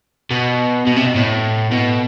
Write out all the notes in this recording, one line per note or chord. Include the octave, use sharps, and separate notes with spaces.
B2
B2
C3
B2
A2
B2